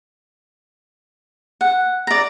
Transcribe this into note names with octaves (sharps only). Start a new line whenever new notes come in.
F#5
D5 A#5